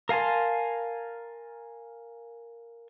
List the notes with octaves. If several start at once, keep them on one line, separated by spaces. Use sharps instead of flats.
A#4 F5 G#5 A5 C6